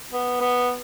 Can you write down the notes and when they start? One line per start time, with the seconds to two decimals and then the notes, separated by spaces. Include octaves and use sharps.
0.13 B3
0.41 B3